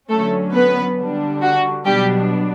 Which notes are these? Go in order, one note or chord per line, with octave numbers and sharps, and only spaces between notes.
D3 F#3 A3 C#4 A4
B3 B4
D3 G3 D4
F#4
B2 F#3 G3 B3 D4 G4